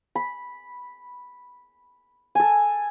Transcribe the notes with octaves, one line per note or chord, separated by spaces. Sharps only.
B5
A4 G#5